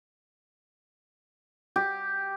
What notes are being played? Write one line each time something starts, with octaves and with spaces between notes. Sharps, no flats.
G4